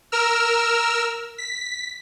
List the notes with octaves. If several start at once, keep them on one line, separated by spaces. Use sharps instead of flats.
A#4 E6 F6
B6